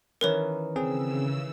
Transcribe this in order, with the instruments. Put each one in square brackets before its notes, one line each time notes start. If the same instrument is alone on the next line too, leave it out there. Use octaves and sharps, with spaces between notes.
[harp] D#3 E3 C#4 [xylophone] A#4 B4 C#5
[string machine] C#3 E6 [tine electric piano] C4 G#4